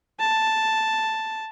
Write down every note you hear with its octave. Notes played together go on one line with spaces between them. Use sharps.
A5